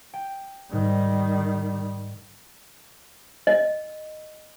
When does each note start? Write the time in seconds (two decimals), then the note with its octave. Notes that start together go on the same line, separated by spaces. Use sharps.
0.14 G5
0.73 G#2 D#3 G3
3.47 D#5